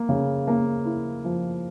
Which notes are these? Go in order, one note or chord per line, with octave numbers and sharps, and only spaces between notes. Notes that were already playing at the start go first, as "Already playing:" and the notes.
Already playing: A#3
C#3
A#3
E4
F3